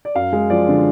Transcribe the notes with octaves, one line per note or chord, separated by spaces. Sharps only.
D5
F#2 F5
G#3
F3 D5
D3